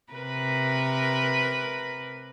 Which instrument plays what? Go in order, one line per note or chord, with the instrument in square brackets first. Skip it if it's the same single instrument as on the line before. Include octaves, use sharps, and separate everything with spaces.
[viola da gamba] C3 A#4 B4